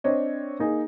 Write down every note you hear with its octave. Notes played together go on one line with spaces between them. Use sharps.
C4 D4 C#5 D#5
A#3 D#4 G#4